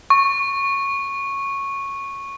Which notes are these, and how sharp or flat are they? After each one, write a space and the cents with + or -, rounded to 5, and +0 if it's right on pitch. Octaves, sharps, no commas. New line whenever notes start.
C#6 -10